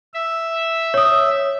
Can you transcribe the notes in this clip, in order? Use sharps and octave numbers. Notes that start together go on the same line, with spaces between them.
E5
C#5 D#6